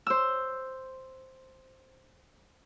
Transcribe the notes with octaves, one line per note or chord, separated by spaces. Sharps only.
C5 E6